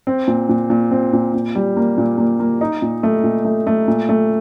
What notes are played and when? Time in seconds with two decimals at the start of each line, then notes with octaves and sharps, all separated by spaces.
0.07 C4
0.28 A#2
0.49 A#2
0.70 A#2
0.91 C4
1.13 A#2
1.34 A#2
1.55 G3
1.77 A#3
1.98 A#2
2.18 A#3
2.40 A#3
2.61 D#4
2.82 A#2
3.03 A3
3.24 A#2
3.45 A3
3.67 A3
3.88 A#2
4.09 A3